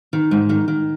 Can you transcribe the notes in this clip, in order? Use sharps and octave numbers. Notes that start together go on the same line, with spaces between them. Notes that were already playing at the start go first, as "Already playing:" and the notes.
D#3
G#2
D#3
D#3